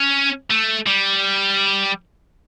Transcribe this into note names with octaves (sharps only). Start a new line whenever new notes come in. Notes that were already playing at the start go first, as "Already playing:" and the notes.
Already playing: C#4
A3
G3